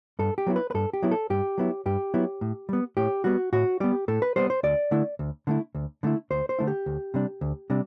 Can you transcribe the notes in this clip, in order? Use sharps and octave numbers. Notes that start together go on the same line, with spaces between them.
G2 A4
G4
F#3 B3 E4
B4
B4
G2 A4
G4
F#3 B3 E4
A4
G2 G4
F#3 B3 E4
G2 G4
F#3 B3 E4
A2
G3 B3
A2 G4
G3 B3 F#4
A2 F#4
G3 B3 G4
A2 A4
B4
G3 B3 C5
C5
D2 D5
D3 A3 E4
D2
D3 A3 E4
D2
D3 A3 E4
D2 C5
C5
D3 A3 E4
G4
D2
C3 G3 D4
D2
C3 G3 D4